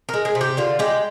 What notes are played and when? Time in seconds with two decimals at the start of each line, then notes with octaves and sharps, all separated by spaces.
0.09 G#3 A#4
0.25 G#4
0.35 C3
0.41 G4
0.57 D3 F4
0.79 G#3 G4